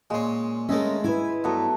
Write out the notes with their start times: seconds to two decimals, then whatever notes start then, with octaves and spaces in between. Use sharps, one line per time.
0.10 A#2 G#3 C#4 C6
0.69 D#3 G#3 A3 C#4 A#4 E5
1.04 E4 B4 G#5
1.44 G2 F#3 A3 B3